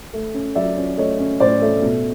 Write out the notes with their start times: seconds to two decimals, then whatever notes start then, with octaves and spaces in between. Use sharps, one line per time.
0.13 A3
0.34 C#4
0.55 F#3 D5 E5
0.77 C#4
0.98 A3 C#5 D#5
1.19 C#4
1.40 A2 C5 D5
1.62 A3
1.82 B2